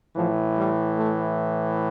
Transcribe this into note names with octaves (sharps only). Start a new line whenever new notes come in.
A2 E3 F3
G3
A3